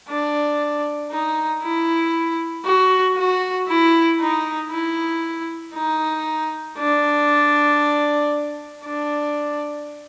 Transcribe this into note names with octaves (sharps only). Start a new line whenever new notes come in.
D4
D#4
E4
F#4
F#4
E4
D#4
E4
D#4
D4
D4